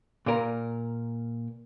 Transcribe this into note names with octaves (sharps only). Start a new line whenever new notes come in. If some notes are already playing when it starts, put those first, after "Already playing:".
A#2 A#4